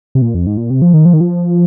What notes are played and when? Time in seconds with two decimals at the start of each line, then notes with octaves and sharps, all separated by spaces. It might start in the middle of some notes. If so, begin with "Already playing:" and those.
0.15 C3
0.22 A#2
0.34 F2
0.47 G#2
0.57 A#2
0.70 C3
0.82 F3
0.94 D#3
1.05 F3
1.13 D#3
1.21 F3